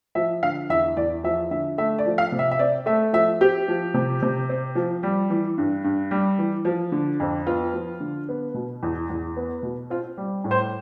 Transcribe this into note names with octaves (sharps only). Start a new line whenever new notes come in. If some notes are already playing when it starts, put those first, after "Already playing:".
F3 E5
D3 F5
E2 E5
E2 D5
F3 E5
D3 E5
A3 E5
D5
F3
F5
C3
E5
E5
C4 D5
A3 E5
F3 E5
C4 G4
F3
C3
C3
C4
F3
G3
E3
G2
G2
G3
E3
F3
D3
F2
B3 F4
F3
D3
B3
B2
E2
E2
B3
B2
C4 F4
G3
A2
C5